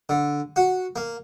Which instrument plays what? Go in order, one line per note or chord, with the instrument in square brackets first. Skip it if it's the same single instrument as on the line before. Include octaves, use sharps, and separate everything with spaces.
[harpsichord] D3
F#4
A#3